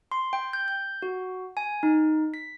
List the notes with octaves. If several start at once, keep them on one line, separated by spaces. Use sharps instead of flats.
C6
G5
G6
G6
F#4
G#5
D#4
B6